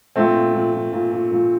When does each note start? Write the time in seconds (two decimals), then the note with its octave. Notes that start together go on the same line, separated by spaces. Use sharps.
0.16 A#2 A3 C4
0.35 A#2
0.54 A#2
0.73 A#2
0.92 A#2
1.12 A#2
1.31 A#2